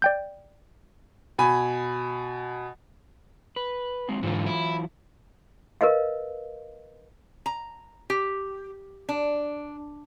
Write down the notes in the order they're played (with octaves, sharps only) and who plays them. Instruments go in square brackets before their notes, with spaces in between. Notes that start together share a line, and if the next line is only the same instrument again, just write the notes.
[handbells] D5 G5 G6
[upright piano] B2 G#5 B5
[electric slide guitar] B4
F#3 G#3 C4
[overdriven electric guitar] G#2 D3 [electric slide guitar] E3 F#3 F4
[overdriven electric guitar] E4
[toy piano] A#4 B4 D#5 F5
[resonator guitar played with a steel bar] A#5
G4
D4